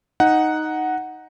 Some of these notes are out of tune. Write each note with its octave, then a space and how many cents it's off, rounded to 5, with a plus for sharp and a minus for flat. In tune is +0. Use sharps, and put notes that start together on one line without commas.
D#4 +0 F#5 +0